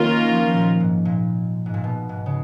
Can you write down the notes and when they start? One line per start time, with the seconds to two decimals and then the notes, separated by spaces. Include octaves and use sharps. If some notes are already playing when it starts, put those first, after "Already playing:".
Already playing: D#3 F#3 A#3 C#4 F4 A#4
0.29 F3
0.54 A#2
0.80 G#2
1.05 A#2
1.66 G#2
1.74 A#2
1.84 B2
2.09 G#2
2.26 C#3